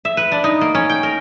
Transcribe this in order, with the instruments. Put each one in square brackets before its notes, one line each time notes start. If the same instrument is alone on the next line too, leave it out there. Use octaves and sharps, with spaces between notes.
[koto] E5
B4
D4
D#4
A#3
C#4
G5
A#4